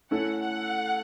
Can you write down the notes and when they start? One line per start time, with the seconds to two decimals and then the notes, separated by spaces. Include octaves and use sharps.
0.11 A3 C#4 E4 A4 F#5
0.39 F#5